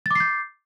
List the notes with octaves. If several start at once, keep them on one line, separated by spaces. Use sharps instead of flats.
D6 G6 A6 C7